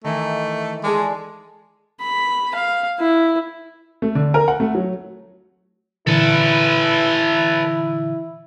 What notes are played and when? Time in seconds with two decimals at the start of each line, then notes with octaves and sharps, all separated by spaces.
0.04 D#3 E3 A3
0.84 G#3 G#4 A4 D5
2.01 B5
2.54 F5
2.99 E4
4.02 A3
4.15 D3
4.34 A#4
4.48 F#5
4.60 A3
4.75 F#3
6.07 A#2 D3 E3 E4 A4 B4